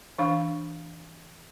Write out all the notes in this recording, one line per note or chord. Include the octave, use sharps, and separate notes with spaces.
E3 D4 F5